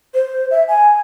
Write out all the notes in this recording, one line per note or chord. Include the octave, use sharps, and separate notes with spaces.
C5
E5
G#5